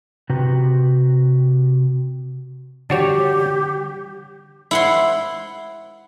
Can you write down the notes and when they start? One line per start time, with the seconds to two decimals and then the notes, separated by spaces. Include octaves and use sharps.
0.30 C3 F#4 B4 G5 A#5
2.90 D3 E3 G3 D4 F#4 G4 C#5
4.71 E4 F#5 C6